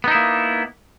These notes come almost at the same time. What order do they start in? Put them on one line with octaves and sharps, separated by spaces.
B3 D#4 E4 A#3